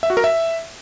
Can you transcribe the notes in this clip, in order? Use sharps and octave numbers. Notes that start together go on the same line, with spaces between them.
E5
F#4
A#4
E5